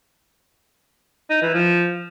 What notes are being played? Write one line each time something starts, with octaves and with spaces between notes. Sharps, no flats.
D#4
E3
F3